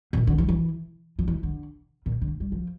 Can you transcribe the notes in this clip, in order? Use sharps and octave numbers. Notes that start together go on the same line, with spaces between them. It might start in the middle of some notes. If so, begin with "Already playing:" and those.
A2
A#2
D3
E3
E3
F3
E3
D3
A#2
D3
G3
F3